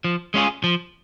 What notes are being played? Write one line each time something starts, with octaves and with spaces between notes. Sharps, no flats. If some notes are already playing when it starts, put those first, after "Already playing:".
F3
G#3 C#4 F4 G#4
F3